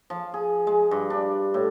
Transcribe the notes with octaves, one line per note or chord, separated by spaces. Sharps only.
F3
G#4
G#3
G2
D4
A2